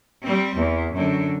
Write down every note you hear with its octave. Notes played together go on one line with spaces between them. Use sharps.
G3 C4
E2
F#2 D3